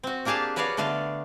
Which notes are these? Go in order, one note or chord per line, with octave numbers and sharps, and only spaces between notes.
C4 F#4
A#3 D4 G4 G#4 F5 A5
F#4 B4 C#5 D5 F5 F#5
D3 A3 B3 B4 F5